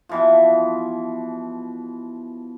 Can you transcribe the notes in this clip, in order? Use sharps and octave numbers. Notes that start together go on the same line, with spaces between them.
B2 E3 F3